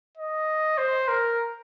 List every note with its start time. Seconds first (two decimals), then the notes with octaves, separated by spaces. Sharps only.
0.17 D#5
0.78 C5
1.08 A#4